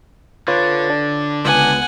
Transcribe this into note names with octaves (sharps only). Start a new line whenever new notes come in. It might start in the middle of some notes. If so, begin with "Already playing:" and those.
D3 F4 B4 C#5
D4
C#2 B3 F#5 G#5